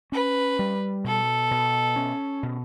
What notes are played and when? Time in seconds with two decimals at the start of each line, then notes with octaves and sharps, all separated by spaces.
0.12 C#4 B4
0.59 G3
1.04 B2 A4
1.51 B2
1.96 C#4
2.43 B2